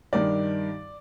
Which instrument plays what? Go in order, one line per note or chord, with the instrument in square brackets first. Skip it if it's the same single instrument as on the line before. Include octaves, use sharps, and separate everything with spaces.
[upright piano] G2 D#3 D5